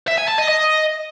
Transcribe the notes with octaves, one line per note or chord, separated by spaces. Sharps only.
E5
G#5
A5
D#5
D#5